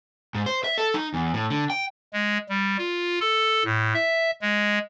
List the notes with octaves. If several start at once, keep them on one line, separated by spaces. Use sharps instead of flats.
G#2
C5
E5
A4
D#4
E2
A2
D3
G5
G#3
G3
F4
A4
A2
E5
G#3